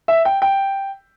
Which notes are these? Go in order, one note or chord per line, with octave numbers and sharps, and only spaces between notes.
E5
G5
G5